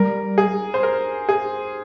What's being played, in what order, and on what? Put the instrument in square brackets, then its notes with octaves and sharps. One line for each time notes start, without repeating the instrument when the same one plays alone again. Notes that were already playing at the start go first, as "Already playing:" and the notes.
Already playing: [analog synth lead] G3 [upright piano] A#4
[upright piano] G#4
C5
A#4
G#4